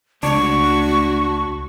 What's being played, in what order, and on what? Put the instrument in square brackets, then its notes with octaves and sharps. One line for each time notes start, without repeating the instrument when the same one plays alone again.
[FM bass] C#2 [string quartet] A3 F#4 [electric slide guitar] D4 [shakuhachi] C#6